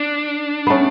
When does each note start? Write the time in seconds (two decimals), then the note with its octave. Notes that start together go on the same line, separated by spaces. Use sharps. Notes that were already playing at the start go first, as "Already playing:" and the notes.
Already playing: D4
0.67 A3 B3 C#4